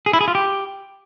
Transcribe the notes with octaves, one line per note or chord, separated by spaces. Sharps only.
G#4
E4
G#4
F4
G4